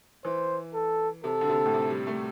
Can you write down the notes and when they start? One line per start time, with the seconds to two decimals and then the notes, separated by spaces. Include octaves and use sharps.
0.25 E3 C5
0.74 A4
1.24 C3 A4
1.41 D3
1.49 C3
1.65 A2
1.74 C3
1.90 G3
2.07 A3